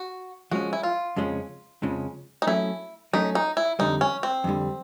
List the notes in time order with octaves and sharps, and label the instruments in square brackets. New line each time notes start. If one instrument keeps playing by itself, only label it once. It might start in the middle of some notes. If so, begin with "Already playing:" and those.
Already playing: [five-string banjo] F#4
[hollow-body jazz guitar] F3 G#3 C#4 [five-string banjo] F#4
[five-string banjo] E4
F4
[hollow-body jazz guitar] F2 C#3 F3 G#3 C#4
F2 C#3 F3 G#3 C#4
[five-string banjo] D#4
[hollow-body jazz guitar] F#3 A3 C#4 [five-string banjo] E4
[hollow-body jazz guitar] F#3 A3 C#4 [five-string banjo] D#4
[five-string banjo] D#4
E4
[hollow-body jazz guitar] F2 D3 G3 [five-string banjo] D#4
[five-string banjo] C#4
C4
[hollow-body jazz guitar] F2 D3 G3